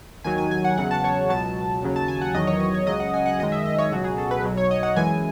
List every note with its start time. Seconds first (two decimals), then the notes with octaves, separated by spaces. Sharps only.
0.24 D#2 D#3 F#3 G#5
0.38 G#5
0.51 G#5
0.64 F#5
0.77 E2 C#3 F#3 F#5
0.91 A5
1.04 C#5
1.29 C#2 B2 F#3 A5
1.82 D#2 C#3 F#3
1.96 A5
2.08 G#5
2.21 F#5
2.34 E2 D#3 F#3 D#5
2.47 C#5
2.60 D#5
2.74 C#5
2.87 C#2 C#3 F#3 D#5
3.00 F#5
3.14 G#5
3.26 F#5
3.39 F#2 D#3 G#3 D#5
3.52 E5
3.66 D#5
3.78 C#5
3.91 C#2 B2 F#3 F#4
4.04 G#4
4.18 A4
4.31 B4
4.45 B1 B2 F#3
4.57 C#5
4.71 D#5
4.83 F#5
4.96 F#2 E3 G#3 G#5